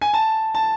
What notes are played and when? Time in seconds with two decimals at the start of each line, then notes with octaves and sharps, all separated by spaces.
0.01 G#5
0.14 A5
0.55 A5